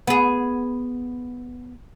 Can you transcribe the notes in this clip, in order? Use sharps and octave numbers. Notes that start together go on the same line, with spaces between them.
B3 G#4